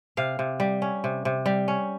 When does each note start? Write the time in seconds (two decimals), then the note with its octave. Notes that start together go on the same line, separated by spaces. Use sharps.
0.17 C3 F5
0.39 C3
0.60 G3
0.82 C#4
1.04 C3
1.25 C3
1.46 G3
1.68 C#4